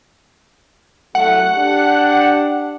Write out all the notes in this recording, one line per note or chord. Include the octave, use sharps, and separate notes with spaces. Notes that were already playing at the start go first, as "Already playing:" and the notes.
C2 F#3 A3 F#5
D4 G4